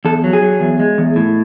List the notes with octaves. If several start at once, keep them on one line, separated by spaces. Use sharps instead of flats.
E2 A4
F#3
G#4
F#3
E2
G#3
E2
A2